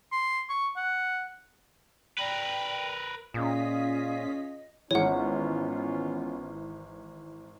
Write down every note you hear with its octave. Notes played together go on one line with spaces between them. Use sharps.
C6
C#6
F#5
A#4 B4 D5 G5
A#2 C#4 F4 G#4 D#5 B6
G#1 E3 B3 C#4 F4 C#5 F#5